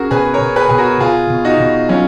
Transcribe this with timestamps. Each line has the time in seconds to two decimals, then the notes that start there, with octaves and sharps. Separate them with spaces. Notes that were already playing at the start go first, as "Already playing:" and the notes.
Already playing: C#4 F#4 G#4 A#4
0.11 B2 G#4 B4
0.33 A#4 C#5
0.41 B2
0.56 G#4 B4
0.69 B2 G#4
0.78 F#4 A#4
1.00 B2 F4 G#4
1.30 B2
1.45 D#4 F#4
1.60 B2
1.89 F#3 C#4 F4